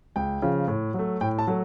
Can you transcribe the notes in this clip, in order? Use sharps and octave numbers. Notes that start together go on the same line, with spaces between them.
C#2 G5
C#3 F3
A2
F#3 A3
A2 G5
A5
F#3 A3